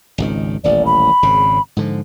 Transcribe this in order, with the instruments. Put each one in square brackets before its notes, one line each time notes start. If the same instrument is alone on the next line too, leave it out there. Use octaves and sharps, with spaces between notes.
[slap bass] G#1 C#2 D#3
[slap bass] D#1 A1 [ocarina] D5
[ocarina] B5
[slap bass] G#1 C#3
G#2 D3 F3